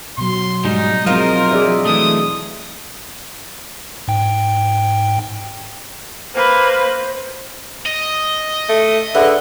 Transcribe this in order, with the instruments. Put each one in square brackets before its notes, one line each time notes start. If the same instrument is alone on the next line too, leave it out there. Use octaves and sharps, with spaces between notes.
[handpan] B2 F#3 [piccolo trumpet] C6
[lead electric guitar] G#2 G3 [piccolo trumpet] D#4
[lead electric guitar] F3 [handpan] F#3 G#3 C4 [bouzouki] D#4 F4 [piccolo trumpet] A#4
[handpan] G#4 D5 E5
[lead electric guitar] E3 A3 [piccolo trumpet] D#6
[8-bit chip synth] G#2 G5
[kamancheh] A#3 B4 [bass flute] C5
[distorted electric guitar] D#5
[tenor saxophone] A3
[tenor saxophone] D3 [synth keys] G#4 B4 F#5 [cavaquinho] E5